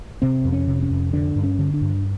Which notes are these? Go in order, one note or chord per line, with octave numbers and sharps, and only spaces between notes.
C3 C4
F2
C#4
C3
C#4
F2
D3 D4
G2
C#4
D3
D4
G2